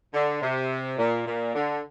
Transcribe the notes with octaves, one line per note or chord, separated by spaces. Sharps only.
D3
C3
A#2
A#2
D3